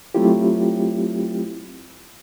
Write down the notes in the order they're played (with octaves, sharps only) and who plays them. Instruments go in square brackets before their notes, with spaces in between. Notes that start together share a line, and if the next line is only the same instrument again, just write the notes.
[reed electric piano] F#3 A3 C4 E4 F4 G4